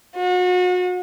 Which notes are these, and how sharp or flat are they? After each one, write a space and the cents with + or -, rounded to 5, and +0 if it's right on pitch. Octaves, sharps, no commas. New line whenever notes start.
F#4 -35